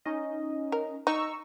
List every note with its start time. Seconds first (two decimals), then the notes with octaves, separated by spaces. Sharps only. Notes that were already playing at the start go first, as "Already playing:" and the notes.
0.05 C#4 D#4 D#5
0.72 A#4
1.07 D#4 A#5 C#6 E6